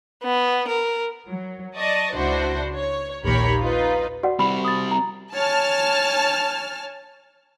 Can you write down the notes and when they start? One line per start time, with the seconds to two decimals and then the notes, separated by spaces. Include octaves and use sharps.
0.24 B3
0.68 A#4
1.27 F#3
1.77 D5 D#5 A5 C#6
2.15 C#2 D4 E4 F#4 C5
2.76 C#5
3.24 A#1 D#2 G4 A#4 C#5 B5
3.61 D#4 F4 B4
4.23 F#4 D5 F#5
4.39 G3 C4 B5
4.65 D#6 A6
4.91 A#5
5.34 C#5 G#5 A5 F6